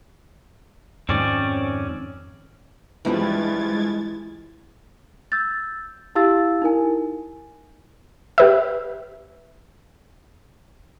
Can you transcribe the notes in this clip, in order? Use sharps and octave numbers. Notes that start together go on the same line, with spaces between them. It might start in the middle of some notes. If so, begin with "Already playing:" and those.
F2 G#2 D#3 C4 C#4 D5
F#1 G2 E3 F3 G3 G#3 G#6 A6
E6 G6 A6
E4 G4 F5 E6 A6
D#4 E4 A#4 G#5
G4 B4 E5